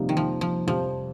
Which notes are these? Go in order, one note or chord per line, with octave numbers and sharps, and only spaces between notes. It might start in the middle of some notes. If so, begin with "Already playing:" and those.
Already playing: F2 C3 G3 A#3 D#4
D#3
F3
F3
F2 C3 F3 G3 C4 F4